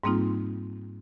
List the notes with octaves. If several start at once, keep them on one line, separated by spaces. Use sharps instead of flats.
G#2 G3 A#3 C4 D#4 F4